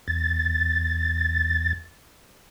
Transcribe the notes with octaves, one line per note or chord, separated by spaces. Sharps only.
E2 A6